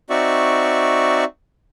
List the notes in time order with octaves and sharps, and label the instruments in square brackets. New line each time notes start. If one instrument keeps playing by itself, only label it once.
[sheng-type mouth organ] C4 D#4 F#4 D5 E5 C#6